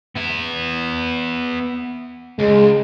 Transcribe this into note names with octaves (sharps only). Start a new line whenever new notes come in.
B3 E4
C#2 G#3